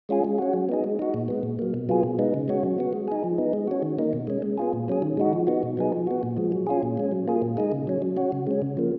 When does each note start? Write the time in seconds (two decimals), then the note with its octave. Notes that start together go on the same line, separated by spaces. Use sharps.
0.09 G#3 C#4 F4 G#4
0.25 G#3
0.38 C#4 F#4
0.53 F#3
0.69 B3 D#4 G#4
0.84 G#3
0.99 D#4 F#4
1.14 A#2
1.28 G#3 B3
1.43 A#2
1.59 F#3 A#3
1.74 B2
1.89 F#3 B3 F4 G#4
2.03 B2
2.19 G#3 B3 D#4
2.34 C#3
2.48 G#3 C#4 F#4
2.63 F#3
2.79 B3 F#4
2.93 G#3
3.08 D#4 G#4
3.24 F3
3.38 B3 D#4
3.53 G#3
3.67 C#4 F#4
3.82 D#3
3.99 A#3 D#4
4.13 B2
4.27 G#3 C#4
4.42 G#3
4.58 B3 F4 G#4
4.73 A#2
4.88 F#3 C#4 G#4
5.02 D#3
5.17 G#3 D#4 F#4
5.33 F3
5.47 B3 D#4 F#4
5.63 B2
5.77 F#3 B3 D#4 G#4
5.92 F3
6.07 B3 F#4
6.23 A#2
6.37 F3 G#3
6.52 F#3
6.67 C#4 F4 G#4
6.83 A#2
6.97 G#3 C#4
7.11 F#3
7.28 A#3 F4 G#4
7.42 A#2
7.57 G#3 D#4 G#4
7.72 C#3
7.87 F#3 C#4
8.02 F#3
8.17 C#4 F#4
8.32 C#3
8.47 G#3 C#4
8.62 C#3
8.77 F3 A#3